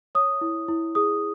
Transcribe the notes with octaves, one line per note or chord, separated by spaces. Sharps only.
C#5 D#6
E4
E4
G#4 D#6